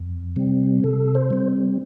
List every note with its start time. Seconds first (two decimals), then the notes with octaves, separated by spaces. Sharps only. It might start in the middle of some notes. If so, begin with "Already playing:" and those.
Already playing: F2
0.36 C3 G3 C4
0.84 C3 A4
1.15 C5
1.30 G3 C4